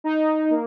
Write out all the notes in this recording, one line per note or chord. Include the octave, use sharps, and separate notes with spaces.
D#4
A#3